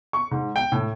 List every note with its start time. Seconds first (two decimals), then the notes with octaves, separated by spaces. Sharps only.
0.13 C#6
0.31 G#2
0.56 G5
0.72 A2